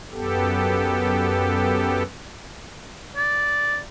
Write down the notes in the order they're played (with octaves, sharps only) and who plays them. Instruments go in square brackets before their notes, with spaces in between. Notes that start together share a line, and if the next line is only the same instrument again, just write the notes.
[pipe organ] F#2 B3 G4 A4
[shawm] D5